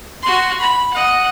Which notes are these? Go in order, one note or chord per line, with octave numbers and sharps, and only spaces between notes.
F#4 C6
B5
D#5 F#5